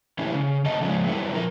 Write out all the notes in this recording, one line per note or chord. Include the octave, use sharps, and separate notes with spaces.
E3 C#4 E4 G4
C#3
D#3 A3 C#4 D#5 A5
C#3 F3 G#3 C#4
F#3 G3 E4 A4 B4
F3 A#4